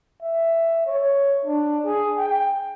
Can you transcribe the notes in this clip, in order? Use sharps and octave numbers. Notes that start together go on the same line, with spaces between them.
E5
C#5
D4
G#4
G5